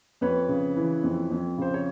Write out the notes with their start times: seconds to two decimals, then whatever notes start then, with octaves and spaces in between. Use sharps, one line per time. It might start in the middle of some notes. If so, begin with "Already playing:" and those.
0.21 F2 B4 C#5
0.49 C#3
0.77 E3
1.03 F2
1.31 F2
1.58 C#3 C5
1.74 C#5